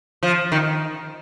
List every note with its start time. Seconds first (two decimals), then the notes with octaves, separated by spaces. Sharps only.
0.23 F3
0.52 D#3